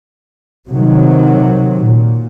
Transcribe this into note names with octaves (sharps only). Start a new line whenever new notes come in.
C3 D#3 F#3
A#2